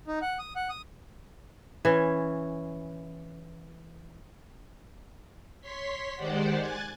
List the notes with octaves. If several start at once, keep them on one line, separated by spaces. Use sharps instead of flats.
D#4
F#5
D#6
F#5
D#6
E3 C#4
C#5 C6 B6
D#3 G#3 G4 C5 D5 F#5
G#5 F#6 G#6 A6